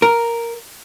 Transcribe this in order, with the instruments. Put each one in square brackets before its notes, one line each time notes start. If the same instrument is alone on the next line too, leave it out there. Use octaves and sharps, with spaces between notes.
[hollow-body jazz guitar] A#4